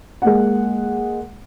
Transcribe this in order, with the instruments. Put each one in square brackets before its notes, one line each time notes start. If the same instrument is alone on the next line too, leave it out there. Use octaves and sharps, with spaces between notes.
[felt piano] G#3 A#3 F#5